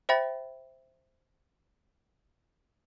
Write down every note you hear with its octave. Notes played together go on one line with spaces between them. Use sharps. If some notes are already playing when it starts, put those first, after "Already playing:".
C5 E5 G5 B5 A6